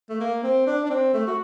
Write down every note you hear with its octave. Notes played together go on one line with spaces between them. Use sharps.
A3
A#3
C4
D4
D4
C4
A3
F#4